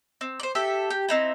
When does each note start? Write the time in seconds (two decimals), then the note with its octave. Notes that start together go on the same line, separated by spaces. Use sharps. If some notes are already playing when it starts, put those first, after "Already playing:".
0.21 C4
0.40 C5 D5
0.55 G4 A4 E5
0.90 G4
1.08 C4 D#4 E4